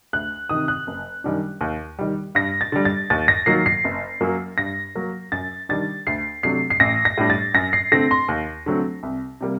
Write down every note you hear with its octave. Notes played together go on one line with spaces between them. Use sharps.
D2 F#6
C3 D#3 D#6
F#6
F#1
F#2 D#3 G3 D4
D#2
D#3 G3
G2 A#6
A6
D3 G3
A6
D#2 A6
A#6
D#3 F#3 A#3 C7
C7
F#1
F#2 F#3 A#3
G2 A#6
F#3 A#3
F#2 A6
D#3 G3 D4 A6
D2 C7
C3 F#3 A3 D4 C7
C7
A1 A#6
A#6
A2 G3 D4
A6
F#2 A#6
C7
D3 A3 C4 A#6
C6
D#2
D3 F#3 A3 C4
C2
C3 G3 A#3